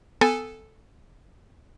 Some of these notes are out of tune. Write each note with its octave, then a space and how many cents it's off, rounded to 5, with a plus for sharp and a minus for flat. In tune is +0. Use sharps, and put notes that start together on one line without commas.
B3 +25 A4 +0 G#5 -15